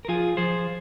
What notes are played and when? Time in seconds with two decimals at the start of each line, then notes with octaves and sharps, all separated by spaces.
0.05 A#4
0.08 F3 F4 G#4
0.37 F3 G#4 C5